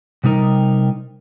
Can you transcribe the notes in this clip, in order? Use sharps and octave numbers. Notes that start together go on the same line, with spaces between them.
C3 G3 D#4 A#4